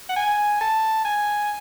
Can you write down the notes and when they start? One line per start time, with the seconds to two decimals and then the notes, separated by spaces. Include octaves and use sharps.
0.09 F#5
0.16 G#5
0.61 A5
1.05 G#5